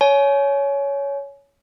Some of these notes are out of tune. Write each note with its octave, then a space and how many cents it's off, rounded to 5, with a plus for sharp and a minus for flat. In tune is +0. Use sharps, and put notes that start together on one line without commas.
C#5 +15 G#5 +30